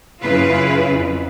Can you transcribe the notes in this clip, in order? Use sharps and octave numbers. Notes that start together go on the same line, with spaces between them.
F#2 C#3 E4 F4 B4 F5
F2